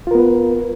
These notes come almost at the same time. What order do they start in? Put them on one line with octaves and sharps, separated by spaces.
F4 A#4 B3 B4